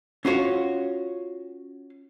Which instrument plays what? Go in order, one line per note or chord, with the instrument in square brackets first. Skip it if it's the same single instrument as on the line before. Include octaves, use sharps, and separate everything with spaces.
[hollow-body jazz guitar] C#4 F4 F#4 C#5